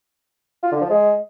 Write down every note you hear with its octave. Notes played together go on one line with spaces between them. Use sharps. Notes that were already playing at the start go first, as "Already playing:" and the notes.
F4
D3
F3
G#3